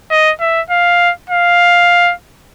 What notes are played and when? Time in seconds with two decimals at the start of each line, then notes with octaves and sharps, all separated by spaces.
0.11 D#5
0.41 E5
0.71 F5
1.30 F5